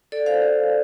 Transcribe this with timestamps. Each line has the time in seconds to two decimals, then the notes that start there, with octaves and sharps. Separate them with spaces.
0.12 A4 D5
0.26 C5 F5